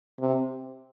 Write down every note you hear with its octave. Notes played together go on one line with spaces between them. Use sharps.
C3